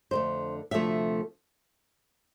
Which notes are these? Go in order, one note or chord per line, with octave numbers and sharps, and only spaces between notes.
F2 D3 A3 C5
D2 C3 F3 A3 E5